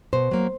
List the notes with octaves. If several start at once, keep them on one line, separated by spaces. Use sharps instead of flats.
B2 C5
F#3 A#3